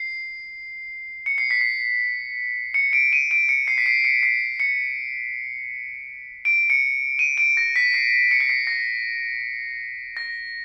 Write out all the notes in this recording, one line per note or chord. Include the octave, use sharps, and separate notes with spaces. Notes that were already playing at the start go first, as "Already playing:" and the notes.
Already playing: C7
C#7
C7
B6
C7
C#7
D7
D#7
D7
C#7
C7
B6
C7
C#7
C7
C#7
D7
C#7
D#7
D7
A#6
B6
C7
C#7
B6
C7
A#6
A#6